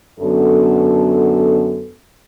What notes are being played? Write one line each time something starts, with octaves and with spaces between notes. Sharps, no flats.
F#2 D3 B3 A4